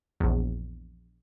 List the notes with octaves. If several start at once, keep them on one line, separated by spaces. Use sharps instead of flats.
A#1 E2